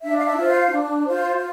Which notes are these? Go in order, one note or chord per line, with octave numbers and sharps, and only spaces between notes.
D4 E5
F5
E5
F4 C5
F5
D4
F4 C5
F4